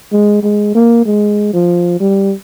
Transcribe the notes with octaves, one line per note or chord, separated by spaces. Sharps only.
G#3
G#3
A#3
G#3
F3
G3